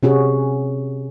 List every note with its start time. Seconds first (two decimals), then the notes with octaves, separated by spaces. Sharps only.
0.03 C3 C#4 F#4 G#4